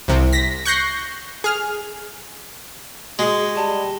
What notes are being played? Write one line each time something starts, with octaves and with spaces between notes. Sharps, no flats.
C2 C3
A#6 B6
C#6 F#6 G6 A#6 C7
G#4 F6
G#3 F#4 G#4
G3 A5